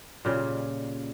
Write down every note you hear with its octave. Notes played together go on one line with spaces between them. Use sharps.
A#2 C#3 G3